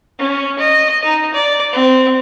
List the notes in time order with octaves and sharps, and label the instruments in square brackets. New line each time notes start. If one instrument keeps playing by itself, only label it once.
[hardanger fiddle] C#4
D#5
D#4
D5
C4